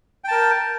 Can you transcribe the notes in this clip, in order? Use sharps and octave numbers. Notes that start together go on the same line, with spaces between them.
A#4 G5 A5